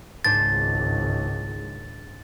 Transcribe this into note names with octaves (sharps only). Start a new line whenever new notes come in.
G#1 C#2 G#2 D4 C5 A6